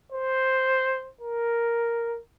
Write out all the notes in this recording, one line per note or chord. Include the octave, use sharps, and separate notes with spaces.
C5
A#4